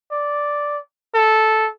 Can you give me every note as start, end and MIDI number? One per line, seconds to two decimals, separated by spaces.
0.11 0.79 74
1.14 1.69 69